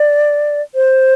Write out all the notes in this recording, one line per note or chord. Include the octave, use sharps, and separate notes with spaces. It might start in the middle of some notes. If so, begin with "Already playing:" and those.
Already playing: D5
C5